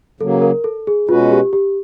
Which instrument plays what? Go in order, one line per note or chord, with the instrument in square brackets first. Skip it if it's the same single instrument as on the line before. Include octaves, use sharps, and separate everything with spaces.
[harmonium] C#3 F#3 A#3 [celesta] A4
[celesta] A#4
A4
G#4
[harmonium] B2 G#3 C#4 F#4 B4 [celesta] F4
[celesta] G4
G4